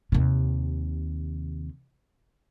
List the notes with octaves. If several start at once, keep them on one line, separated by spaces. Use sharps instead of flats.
D#2 C3